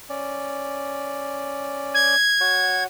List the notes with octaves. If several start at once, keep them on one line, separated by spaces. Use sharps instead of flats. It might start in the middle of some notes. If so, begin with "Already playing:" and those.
C#4 D5
G#6
F#4 C#5 F#5